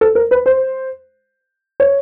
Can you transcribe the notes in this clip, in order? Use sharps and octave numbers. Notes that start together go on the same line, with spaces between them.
A4
A#4
B4
C5
C#5